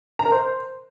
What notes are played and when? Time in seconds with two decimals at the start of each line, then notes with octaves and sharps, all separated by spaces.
0.19 A#5
0.26 A#4
0.32 C5